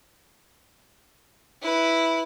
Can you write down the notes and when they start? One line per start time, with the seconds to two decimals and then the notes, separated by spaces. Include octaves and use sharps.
1.62 E4 B4